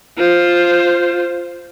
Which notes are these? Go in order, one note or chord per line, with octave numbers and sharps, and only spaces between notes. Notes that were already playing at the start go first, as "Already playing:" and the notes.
F4 C5